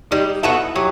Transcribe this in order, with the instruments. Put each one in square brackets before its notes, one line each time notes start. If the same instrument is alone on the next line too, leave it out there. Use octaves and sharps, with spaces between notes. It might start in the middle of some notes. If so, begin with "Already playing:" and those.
[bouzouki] G3 [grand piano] D#4
[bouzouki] B3 F#4 A4 [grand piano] E4
[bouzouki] F#3 [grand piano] G4